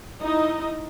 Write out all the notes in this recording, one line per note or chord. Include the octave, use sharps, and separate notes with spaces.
D#4 E4 D#5